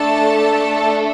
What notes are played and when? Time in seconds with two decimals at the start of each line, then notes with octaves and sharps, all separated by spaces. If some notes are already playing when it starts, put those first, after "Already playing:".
Already playing: A3 D4 A4 A5